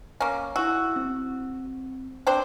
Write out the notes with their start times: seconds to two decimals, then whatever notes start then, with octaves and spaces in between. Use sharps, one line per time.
0.20 A#3 C#4
0.56 E4 F#4 E6
0.96 C4
2.27 C4 D4 C5